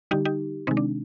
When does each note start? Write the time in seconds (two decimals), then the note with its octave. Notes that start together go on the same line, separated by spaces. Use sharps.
0.11 D3 G3 D#4 G4
0.25 D#4 G4
0.67 C3 D#3 G#3 C4 D#4
0.77 D4